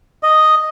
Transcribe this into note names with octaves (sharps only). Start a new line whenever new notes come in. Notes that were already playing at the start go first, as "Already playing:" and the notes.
D#5